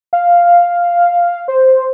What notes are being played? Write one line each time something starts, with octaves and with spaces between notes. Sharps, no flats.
F5
C5